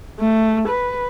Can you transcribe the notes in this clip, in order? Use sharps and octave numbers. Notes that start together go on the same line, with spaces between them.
A3
B4